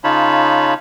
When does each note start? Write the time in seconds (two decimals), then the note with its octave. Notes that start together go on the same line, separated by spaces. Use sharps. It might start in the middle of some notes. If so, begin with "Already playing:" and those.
0.04 C#3 D#4 F4 C#5 A5 B5